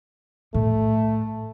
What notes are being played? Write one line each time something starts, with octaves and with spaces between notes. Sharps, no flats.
A2 A3